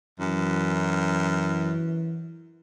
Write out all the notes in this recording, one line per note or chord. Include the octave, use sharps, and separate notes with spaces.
F#2 E3